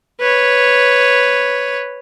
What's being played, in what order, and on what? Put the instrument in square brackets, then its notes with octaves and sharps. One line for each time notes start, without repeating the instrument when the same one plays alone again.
[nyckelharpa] B4 C#5